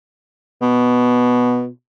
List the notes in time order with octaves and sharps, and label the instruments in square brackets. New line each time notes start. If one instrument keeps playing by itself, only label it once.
[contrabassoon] B2